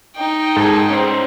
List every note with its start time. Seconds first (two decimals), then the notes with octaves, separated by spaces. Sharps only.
0.16 D#4 G5
0.56 G#2 G#4 A4
0.90 C#4 C5